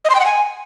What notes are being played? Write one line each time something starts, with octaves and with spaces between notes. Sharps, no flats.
D#5
C6
G5
F#5
G#5